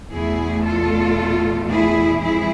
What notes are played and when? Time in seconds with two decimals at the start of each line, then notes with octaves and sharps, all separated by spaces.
0.12 E2 B2 A3 E4 G#4
0.65 F4 A4
1.70 E4 G#4
2.22 F2 E3 G#3 E4 G#4